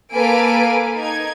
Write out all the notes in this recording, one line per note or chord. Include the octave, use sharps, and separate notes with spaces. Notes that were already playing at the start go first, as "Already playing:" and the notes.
A#3 A4 B4 F5 G#5 D7
D#4 G#6